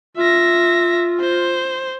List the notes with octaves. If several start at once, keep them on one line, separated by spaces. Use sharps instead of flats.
F4 E5 A#6
C5